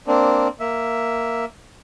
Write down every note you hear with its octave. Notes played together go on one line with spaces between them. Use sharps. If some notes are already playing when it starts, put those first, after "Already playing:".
A#3 C4 D4
A#3 E5